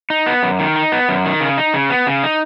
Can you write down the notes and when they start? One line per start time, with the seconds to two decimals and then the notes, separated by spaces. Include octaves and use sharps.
0.10 D#4
0.26 B3
0.43 F#2
0.59 D#3
0.76 D#4
0.92 B3
1.09 F#2
1.25 D#3
1.41 C#3
1.58 D#4
1.74 C#3
1.90 B3
2.07 C#3
2.23 D#4